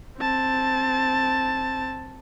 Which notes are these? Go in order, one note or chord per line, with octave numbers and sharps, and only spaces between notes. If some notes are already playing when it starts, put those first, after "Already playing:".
C4 A5